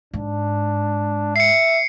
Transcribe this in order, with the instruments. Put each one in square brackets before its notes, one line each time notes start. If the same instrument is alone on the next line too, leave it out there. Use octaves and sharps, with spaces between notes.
[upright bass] G#2 [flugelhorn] D4
[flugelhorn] E5 [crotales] C7 C#7